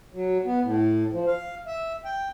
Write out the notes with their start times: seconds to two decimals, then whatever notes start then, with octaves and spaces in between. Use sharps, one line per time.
0.13 F#3
0.45 B3
0.64 A2
1.13 F3
1.27 F5
1.67 E5
2.05 G5